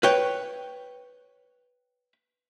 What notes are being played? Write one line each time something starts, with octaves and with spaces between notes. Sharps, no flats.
B4 C#5 G5